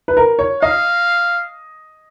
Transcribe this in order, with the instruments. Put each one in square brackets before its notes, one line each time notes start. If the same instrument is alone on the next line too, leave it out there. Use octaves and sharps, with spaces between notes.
[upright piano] B4
A#4
C#5
[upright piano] D#5 [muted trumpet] F5